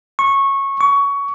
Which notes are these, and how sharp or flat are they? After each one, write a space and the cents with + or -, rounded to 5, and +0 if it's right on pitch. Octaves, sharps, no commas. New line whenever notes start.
C#6 -15
C#6 +20